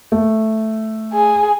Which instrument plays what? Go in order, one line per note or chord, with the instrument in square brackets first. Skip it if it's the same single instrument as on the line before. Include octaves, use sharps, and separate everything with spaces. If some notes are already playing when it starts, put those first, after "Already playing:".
[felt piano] A3
[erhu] G#4